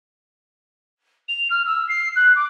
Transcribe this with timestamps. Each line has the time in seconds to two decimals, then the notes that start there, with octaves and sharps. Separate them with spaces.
1.28 F7
1.50 F6
1.65 E6
1.88 C7
2.15 F#6
2.35 D6